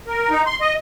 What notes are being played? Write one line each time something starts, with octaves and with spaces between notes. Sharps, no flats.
A#4
D#4
C6
D#5